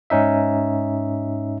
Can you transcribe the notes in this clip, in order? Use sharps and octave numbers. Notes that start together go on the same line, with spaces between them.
G#2 C#4 D#4 E5